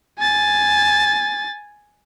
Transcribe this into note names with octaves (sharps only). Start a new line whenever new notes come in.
G#5 A6